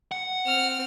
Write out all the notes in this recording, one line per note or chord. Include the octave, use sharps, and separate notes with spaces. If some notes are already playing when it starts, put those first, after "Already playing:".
F#5
C4 F6